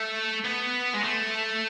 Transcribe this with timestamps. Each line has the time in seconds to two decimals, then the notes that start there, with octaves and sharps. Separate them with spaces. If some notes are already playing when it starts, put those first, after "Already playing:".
Already playing: A3
0.44 B3
0.94 G#3
1.04 A3